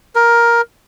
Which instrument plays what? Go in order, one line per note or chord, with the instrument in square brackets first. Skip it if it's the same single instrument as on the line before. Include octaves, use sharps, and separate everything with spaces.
[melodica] A#4